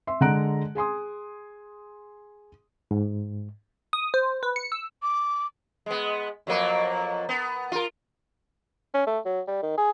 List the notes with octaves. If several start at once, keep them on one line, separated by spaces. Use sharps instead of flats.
E5 C6
D3 G#3 F#5 A#5 F#6 D7
G#4 G#5 C6 D#6
G#2
D#6
C5
B4
C#7
E6
D6
G#3 B3
F2 F#3 A#3
B3
F4 A#4
C#4
A3
F#3
G3
D#3
G#4